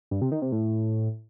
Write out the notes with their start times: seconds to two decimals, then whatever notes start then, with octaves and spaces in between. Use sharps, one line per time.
0.11 G2
0.22 C3
0.32 D#3
0.42 C3
0.52 A2